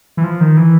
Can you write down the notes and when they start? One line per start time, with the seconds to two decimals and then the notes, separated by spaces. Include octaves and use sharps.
0.17 E3
0.24 F3
0.41 D#3
0.57 E3